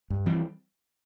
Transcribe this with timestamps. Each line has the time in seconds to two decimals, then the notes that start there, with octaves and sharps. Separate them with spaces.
0.10 G2
0.26 E3 G3 C4